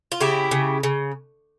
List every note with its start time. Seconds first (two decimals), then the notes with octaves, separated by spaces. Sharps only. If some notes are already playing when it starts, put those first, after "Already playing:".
0.12 F4
0.20 C#3 E4 G4
0.51 C#3
0.83 C#3